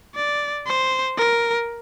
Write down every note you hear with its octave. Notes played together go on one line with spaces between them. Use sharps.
D5
C5
A#4